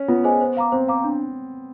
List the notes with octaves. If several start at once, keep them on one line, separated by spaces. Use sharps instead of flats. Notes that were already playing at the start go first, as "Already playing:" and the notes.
Already playing: C#4
B3 F4
G#4 C5 D#5 G#5
C5
F5 A#5 D6
C4 C5
F5 A#5 D6
D4